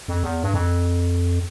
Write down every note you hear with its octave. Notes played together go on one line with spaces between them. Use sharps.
F2
E2
G2
F2